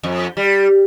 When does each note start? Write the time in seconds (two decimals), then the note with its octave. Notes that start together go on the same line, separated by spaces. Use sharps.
0.03 F2
0.37 G3